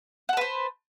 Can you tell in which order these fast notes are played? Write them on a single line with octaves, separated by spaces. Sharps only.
F#5 A5 B4 C5